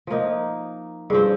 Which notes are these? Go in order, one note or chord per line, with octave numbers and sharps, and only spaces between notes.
F3 A#3 D#4
G2 F3 C4 G#4